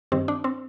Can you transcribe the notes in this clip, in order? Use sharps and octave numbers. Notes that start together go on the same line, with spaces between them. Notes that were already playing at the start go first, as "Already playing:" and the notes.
G2 D#3 C4
D4
C4